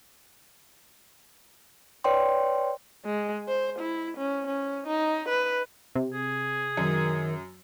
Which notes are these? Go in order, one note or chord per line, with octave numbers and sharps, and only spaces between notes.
B4 C#5 D5 G5 C6
G#3
C5
E4
C#4
C#4
D#4
B4
C3
G#4
F#2 D#3